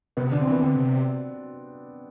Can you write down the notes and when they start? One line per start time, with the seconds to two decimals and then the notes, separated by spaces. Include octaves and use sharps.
0.17 C3 B3
0.31 D3 D4
0.41 C4
0.47 E3
0.52 B3
0.61 D3 C4
0.76 C3